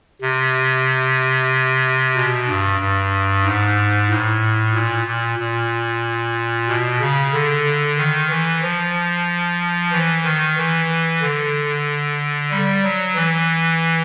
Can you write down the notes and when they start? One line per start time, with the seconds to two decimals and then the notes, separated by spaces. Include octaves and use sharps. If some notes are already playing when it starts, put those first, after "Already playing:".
0.21 C3
2.16 B2
2.48 G2
2.80 G2
3.45 G#2
4.10 A2
4.75 A#2
5.07 A#2
5.39 A#2
6.69 B2
7.01 C#3
7.33 D3
7.98 D#3
8.30 E3
8.63 F3
9.92 E3
10.24 D#3
10.57 E3
11.22 D3
12.51 G3
12.84 F#3
13.15 E3